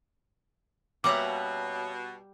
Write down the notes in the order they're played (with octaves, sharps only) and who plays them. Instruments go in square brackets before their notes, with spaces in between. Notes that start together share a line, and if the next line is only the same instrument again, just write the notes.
[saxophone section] B2 [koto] G3 F#5 A#5 [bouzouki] A#3 C#4 E5 [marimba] D6